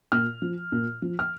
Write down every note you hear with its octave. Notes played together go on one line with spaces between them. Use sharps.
A#2 F6
F3
A#2
F3
F6